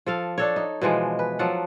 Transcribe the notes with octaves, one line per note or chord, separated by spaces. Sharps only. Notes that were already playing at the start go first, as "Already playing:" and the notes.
F3 A4 F5
D4 A4 C#5
D#4
B2 E3 F3 G#3
B4
F3 F#3 A4 F#5